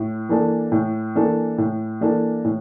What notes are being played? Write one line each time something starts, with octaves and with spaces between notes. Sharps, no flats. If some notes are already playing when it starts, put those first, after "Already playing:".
Already playing: A2
E3 A#3 D4 A4
A2
E3 A#3 D4 A4
A2
E3 A#3 D4 A4
A2